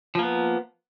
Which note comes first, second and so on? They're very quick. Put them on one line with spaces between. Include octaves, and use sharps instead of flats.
F3 A#3 B3